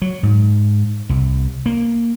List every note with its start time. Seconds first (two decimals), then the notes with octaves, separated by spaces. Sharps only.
0.02 F#3
0.23 G#2
1.09 C2
1.66 A#3